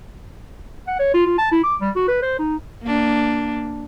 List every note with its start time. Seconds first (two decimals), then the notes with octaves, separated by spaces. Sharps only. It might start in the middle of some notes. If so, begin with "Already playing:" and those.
0.87 F#5
0.99 C#5
1.14 F4
1.26 F4
1.38 A5
1.52 E4
1.63 D6
1.81 G3
1.96 F#4
2.08 B4
2.22 C5
2.39 D#4
2.82 A#3 D4